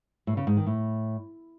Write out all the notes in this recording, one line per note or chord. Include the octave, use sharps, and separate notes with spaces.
A2
C#3
G#2
D#3
A2